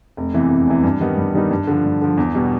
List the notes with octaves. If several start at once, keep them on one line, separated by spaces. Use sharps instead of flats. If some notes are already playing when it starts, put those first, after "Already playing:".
F1
E2 C3 E3
F1
E2 C3 E3
G2
D#3 G3 B3 D#4
G2
D#3 G3 B3 D#4
G2
D3 F3
G2
D3 F3
E2
B2 G3 B3